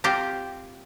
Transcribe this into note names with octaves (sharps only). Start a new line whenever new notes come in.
C4 F4 G4 C5